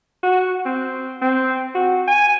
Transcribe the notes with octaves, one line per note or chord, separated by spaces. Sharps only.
F#4
C4
C4
F#4
G#5